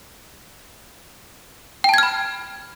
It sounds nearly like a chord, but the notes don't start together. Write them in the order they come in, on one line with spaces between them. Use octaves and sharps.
G5 A5 G#6 F6 B5